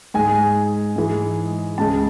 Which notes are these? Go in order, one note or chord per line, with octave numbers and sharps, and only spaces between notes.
G#2 G#3 G#5
G#2 E3 G#3
C#2 C#3 G#3 A5